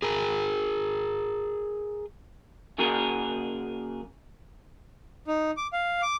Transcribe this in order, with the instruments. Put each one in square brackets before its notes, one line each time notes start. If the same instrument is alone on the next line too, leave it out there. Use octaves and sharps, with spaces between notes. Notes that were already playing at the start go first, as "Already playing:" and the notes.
[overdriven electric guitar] G#4 A#4
[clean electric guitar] C#3 F#3 A#3 G#4 A#4
[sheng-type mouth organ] D#4
D6
F5
D6